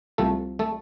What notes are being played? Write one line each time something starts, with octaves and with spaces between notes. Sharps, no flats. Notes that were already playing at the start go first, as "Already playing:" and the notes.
C2 C3 F3 A3 A4
A3 A4